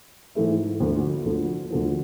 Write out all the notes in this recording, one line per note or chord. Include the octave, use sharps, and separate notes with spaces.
G#2 E3 A3 E4
D2 D3 F3
D2 D3 F3
D2 D3 F3